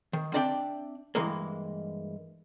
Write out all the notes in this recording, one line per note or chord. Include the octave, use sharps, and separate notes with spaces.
D#3
C4 D4 D5 E5 G5
G2 E3 G#3 A#3